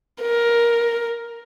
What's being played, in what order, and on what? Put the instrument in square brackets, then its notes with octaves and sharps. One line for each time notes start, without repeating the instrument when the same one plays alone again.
[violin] A#4